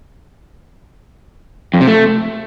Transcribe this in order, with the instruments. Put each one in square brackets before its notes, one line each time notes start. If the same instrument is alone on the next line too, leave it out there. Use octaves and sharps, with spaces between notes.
[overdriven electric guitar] F2
C3
A3